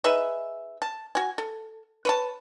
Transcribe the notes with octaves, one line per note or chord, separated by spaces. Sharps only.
D#4 G#4 B4 E5
A5
F#4 G#5
A4
B4 C#5 A5